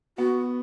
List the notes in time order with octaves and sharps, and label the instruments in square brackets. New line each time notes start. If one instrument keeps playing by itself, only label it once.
[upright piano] B3 [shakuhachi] F#4